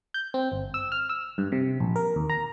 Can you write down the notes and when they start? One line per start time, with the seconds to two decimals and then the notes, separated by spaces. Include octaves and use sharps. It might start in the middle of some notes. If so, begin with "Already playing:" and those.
0.14 G6
0.34 C4
0.52 G1
0.74 E6
0.92 F6
1.09 E6
1.38 G2
1.52 C3
1.80 A#1
1.96 A#4
2.16 D#2
2.30 A#5